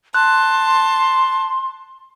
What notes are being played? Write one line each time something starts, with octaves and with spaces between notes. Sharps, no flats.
A5 C6 F#6